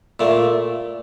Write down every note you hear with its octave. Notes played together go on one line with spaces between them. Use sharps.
A#2 A3